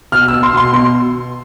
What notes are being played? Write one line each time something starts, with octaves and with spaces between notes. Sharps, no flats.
B2 F6
B2 E6
C6
B2 C6
B2 C6